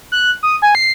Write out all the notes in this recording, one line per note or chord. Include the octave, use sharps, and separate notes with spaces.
F#6
D#6
G#5
C7